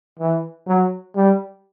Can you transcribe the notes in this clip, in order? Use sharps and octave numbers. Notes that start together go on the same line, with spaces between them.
E3
F#3
G3